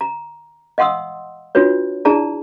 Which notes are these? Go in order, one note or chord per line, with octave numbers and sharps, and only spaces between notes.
A#5
D#5 F5 F#5 C6 D#6 E6
D4 F4 F#4 B4 C#5
D4 E4 G#4 D5 A5 A#5